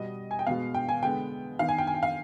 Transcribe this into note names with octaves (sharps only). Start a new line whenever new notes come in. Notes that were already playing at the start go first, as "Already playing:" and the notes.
Already playing: B2 G3 B3 D#5
G#5
G5
B2 G#3 B3 F5
G5
G#5
D3 G#3 B3 G5
D#3 B3 F5
G#5
G5
G#5
G5
F5